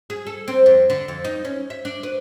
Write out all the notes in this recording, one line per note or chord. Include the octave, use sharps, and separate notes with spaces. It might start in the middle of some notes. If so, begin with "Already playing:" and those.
G#4
A4
C4
F2
D3
F2
D#4
C#4
E5
D4
B4